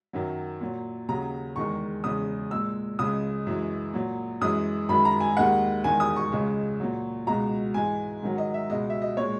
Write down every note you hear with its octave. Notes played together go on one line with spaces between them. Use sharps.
F#2 D#3 F#3
A#2 F#3
D#2 C#3 F#3 A#5
E2 D#3 G#3 C#6
E2 C#3 G#3 D#6
A#2 G#3 E6
C#2 C#3 G#3 D#6
F#2 E3 G#3
A#2 F#3
F#2 E3 G#3 D#6
F#2 D#3 G#3 B5
A#5
G#5
D#2 D#3 G#3 F#5
E2 D#3 G#3 G#5
D#6
C#6
C#2 C#3 G#3
A#2 F#3
C#2 B2 G#3 A#5
G#2 E3 G#3 G#5
G#2 D#3 F#3
D#5
E5
C#2 B2 G#3 D#5
E5
D#5
A#2 G#3 C#5